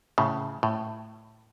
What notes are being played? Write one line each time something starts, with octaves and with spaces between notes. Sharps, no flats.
A2 C#3
A2